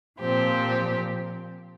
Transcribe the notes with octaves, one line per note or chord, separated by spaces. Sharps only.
A#2 F3 C4 G4 C5